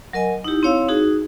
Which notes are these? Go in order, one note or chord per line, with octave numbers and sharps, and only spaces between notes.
F#3 A#4 D#5 G#5
D#4 E4 G4
C4 E4 C#5 F5 E6
D#4 F#4 G#4